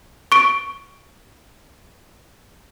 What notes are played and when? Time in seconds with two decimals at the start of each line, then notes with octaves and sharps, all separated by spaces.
0.32 C#6 D7